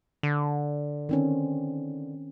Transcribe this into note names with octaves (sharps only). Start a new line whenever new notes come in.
D3
D#3 C4 C#4